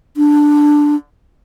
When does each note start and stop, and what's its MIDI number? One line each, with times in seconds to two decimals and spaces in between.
0.17 0.96 62